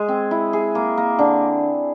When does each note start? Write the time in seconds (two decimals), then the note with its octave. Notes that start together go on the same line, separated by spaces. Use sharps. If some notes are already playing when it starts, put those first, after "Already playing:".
Already playing: G#3 G#4
0.08 C4
0.31 E4
0.53 G#4
0.75 A#3
0.97 A#3
1.19 D3